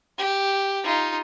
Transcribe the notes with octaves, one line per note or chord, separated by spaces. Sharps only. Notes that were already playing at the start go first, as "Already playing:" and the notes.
G4
D#4 F4